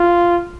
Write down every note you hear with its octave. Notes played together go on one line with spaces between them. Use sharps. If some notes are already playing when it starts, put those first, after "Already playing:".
Already playing: F4